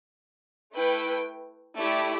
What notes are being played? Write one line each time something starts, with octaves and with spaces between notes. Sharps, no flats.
A3 E4 B4 G5
A3 E4 G4 D5